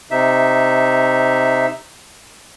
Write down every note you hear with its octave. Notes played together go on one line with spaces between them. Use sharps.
C3 D#4 E5